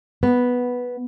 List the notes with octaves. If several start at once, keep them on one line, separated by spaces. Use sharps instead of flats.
B3